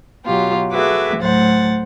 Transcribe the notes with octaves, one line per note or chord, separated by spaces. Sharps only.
B2 F#3 F4 G4
F#4 G#4 A4 B4 E5 D6
D2 A2 F#3 C5 F#5 A6